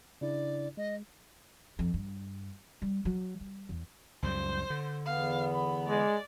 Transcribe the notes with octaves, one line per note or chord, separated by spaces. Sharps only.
C#3 D4 E4 D5
G#3 D#5
F2
G2
G3
F#3
G3
E2
C#2 F#2 G3 C5
D3
E2 B3 F5
B5
G#3 D5